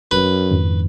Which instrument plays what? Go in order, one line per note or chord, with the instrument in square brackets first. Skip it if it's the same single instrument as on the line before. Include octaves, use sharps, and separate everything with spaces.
[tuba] F#2 [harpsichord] B4
[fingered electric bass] F2 G#2 D#3